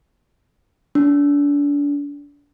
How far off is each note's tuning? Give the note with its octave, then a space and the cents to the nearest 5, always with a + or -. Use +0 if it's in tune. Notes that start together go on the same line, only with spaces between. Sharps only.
D4 -35